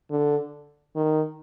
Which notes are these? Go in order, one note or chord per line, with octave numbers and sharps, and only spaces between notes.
D3
D#3